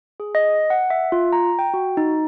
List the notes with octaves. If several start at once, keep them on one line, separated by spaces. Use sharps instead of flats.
G#4
D#5
F#5
E5
F4
A#5
G5
F#4
D#4